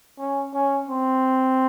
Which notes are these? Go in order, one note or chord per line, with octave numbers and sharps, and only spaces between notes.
C#4
C#4
C4